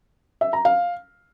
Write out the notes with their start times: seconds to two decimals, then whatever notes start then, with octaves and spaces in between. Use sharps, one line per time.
0.41 E5
0.53 A#5
0.65 F5